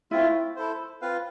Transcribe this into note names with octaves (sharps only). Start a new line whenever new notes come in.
A3 C4 E4 F4
E4 A4 C5
C4 F4 B4 F5